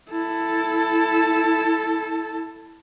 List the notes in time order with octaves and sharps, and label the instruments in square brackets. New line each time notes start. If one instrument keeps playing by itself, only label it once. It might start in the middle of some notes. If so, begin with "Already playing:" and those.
[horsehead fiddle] E4 A4